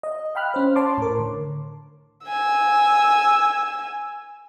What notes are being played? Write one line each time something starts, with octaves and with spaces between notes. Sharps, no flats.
D#5
F5 G5 B5 F6 F#6
C#4 C5
C#5 A5 C6 D6
A2 A#4
D3
G#5 E6